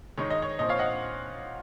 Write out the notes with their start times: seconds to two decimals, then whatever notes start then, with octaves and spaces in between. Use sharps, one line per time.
0.18 D#3 G#3 D#4 C#5
0.30 D#5
0.42 C#5
0.59 A#2 F3 C4 D#5
0.69 C#5 F5
0.79 D#5 F#5